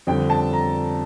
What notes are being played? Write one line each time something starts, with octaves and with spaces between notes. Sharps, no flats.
F2 D3 G3 G5
A5
A#5